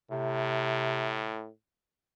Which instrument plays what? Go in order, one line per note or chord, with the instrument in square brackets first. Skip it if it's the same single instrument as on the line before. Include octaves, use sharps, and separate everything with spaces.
[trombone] A2 [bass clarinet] C3